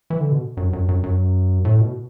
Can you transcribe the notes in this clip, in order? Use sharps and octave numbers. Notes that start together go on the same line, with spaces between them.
E3
D3
B2
F#2
F#2
F#2
F#2
A2
B2